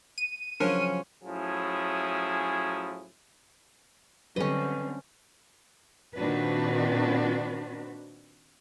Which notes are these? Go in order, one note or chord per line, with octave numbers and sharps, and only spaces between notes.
D#7
C#3 F3 F#3 C#4 D4 A#4
A2 F3 F#3 C#4 E4 G#4
D3 F#3 G3 C4 C#4 A4 B4 D#5
A#2 D#3 C4 D4 F#4 B4